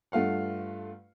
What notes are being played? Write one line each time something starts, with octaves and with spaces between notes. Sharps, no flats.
G2 A3 F4 F5 F#5